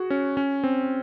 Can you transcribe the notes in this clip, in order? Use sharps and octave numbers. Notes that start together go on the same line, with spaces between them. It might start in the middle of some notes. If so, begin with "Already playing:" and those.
Already playing: F#4 G#4
C#4
C#4
C4